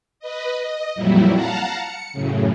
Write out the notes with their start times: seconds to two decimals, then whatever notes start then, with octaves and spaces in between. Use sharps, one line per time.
0.20 B4 D#5
0.59 D#5
0.95 F2 A#2 F#3 G3 E4
1.33 F5 F#5 A5 A#5
1.78 C#7
2.13 F#2 A2 C#3